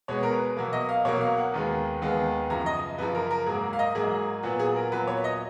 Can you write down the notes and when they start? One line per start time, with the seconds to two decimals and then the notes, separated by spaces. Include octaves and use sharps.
0.08 B2 G#3 B3 C#5
0.23 A#4
0.32 B4
0.57 B2 F#3 A#3
0.73 D#5
0.89 F5
1.05 B2 F#3 A#3 C#5
1.21 F5
1.37 F#5
1.54 D#2 D#3 G#3 B3
2.02 D#2 D#3 G#3 B3
2.50 F#2 C#3 F3 A#5
2.66 D#5
2.98 F#2 C#3 F3 B4
3.15 A#4
3.31 A#4
3.46 G#2 F#3 A#3 G#4
3.73 F5
3.79 D#5
3.95 G#2 F#3 A#3 G#4
4.43 A#2 F#3 B3 F#4
4.59 G#4
4.76 A#4
4.92 A#2 F#3 B3 B4
5.07 C#5
5.24 D#5